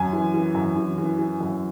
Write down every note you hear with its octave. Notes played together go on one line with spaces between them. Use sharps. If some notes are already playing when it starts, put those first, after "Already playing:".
Already playing: F#2 G#5
E3
E3
F#2
E3
E3
E3
F#2